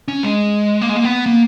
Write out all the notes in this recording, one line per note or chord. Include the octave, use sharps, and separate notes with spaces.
C#4
G#3
A#3
G#3
A#3
B3
A#3